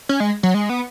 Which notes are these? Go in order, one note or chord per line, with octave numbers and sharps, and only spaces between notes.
C#4
G#3
F#3
G#3
B3